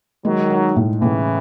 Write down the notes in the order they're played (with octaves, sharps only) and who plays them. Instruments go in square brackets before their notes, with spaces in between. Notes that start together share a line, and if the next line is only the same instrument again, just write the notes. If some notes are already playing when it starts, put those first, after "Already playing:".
[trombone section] D#3 F#3 [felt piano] G#3
[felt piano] D#4
A2
[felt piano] A2 [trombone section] C#3 E3